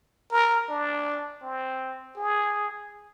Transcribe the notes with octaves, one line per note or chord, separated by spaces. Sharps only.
A#4
D4
C4
G#4